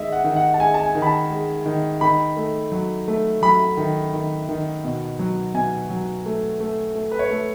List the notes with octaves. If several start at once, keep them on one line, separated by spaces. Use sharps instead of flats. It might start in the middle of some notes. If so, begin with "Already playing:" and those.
Already playing: D#3 G#3 D#5 E5
F#5
D#3
F#5
A5
G#3 G#5
A5
G#5
D#3
B5
A5
G#3
D#3
D#3 B5
A3
F#3
A3
F#3 B5
D#3
D#3
D#3
B2
F#3
B2 G#5
F#3
A3
A3
A3
B4
C#5
A3